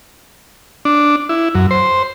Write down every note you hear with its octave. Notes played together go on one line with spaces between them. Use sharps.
D4
E4
F#2
C5